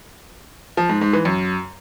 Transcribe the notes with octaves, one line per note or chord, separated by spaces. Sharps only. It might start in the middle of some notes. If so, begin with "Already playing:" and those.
F3
G#2
G#2
E3
F#2